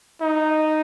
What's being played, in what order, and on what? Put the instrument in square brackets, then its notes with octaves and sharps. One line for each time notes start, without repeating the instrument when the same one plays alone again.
[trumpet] D#4